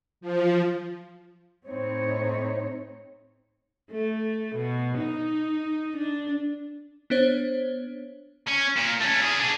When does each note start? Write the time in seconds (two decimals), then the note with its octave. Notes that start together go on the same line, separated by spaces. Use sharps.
0.21 F3
1.67 A2 C4 D#4 C#5
3.91 A3
4.55 B2
4.98 D#4
5.97 D4
7.10 B3 D4 C5 C#5
8.47 C#4
8.77 A#2
9.01 A3 C#4
9.22 E4 G#4
9.39 D4 G#4